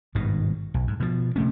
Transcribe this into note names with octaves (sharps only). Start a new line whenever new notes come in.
G#1 G2 B2 D#3
B1
G#2
B2 F3
C3 A3 C#4